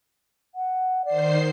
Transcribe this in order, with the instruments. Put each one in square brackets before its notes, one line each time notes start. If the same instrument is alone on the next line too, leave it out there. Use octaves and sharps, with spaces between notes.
[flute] F#5
[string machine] D#3 C5 C7 [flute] D5